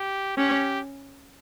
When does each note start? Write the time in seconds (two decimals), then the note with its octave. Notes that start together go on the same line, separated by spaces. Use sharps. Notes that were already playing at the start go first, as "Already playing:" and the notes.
Already playing: G4
0.37 C#4 G4